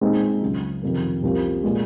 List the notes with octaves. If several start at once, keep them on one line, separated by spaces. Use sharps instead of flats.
A#2 G#3 C4 D#4
C#2 C#3 F#3
F2 C3 D#3 A#3
C2 C3 F3 A#3
A#2 G#3